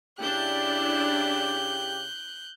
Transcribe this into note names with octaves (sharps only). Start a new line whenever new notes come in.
C#3 D4 E4 G4 F#6 G6